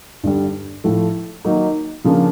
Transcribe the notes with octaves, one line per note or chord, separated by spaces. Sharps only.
G2 D3 G3
A2 F3 A3
D#3 F#3 A#3 D#4
C#3 F3 A#3 D4